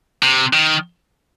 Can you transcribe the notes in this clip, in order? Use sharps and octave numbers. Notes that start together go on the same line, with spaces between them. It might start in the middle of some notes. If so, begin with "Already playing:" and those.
C3
D#3